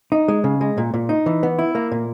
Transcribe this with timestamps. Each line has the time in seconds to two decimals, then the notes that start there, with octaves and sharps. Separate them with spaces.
0.12 D#4
0.28 G#3
0.44 C#3
0.61 G#3
0.78 A#2
0.94 A#2
1.09 D#4
1.26 E3
1.43 B3
1.59 E4
1.75 A#3
1.92 A#2